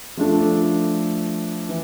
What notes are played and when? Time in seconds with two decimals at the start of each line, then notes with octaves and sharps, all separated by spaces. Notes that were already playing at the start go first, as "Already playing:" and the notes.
0.17 F3 A3 D4 A4
1.69 E3